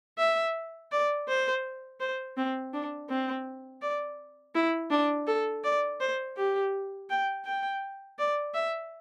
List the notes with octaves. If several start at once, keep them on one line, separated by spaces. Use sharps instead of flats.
E5
D5
C5
C5
C4
D4
C4
D5
E4
D4
A4
D5
C5
G4
G5
G5
D5
E5